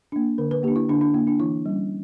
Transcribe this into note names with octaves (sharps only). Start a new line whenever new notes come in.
A#3 D4
D3 A#4
B4
A#3 D4 G4
E4
D3 D4
D4
A#3 D4 E4
D4
E3 E4
G3 C#4